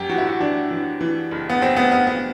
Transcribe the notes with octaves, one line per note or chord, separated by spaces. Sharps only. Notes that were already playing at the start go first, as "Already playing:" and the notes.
Already playing: F#2 G4
E3 F#4
E4
F#4
E3 D4
E3
E3
F#1
B3
F#1 C4
B3
F#1 B3
B3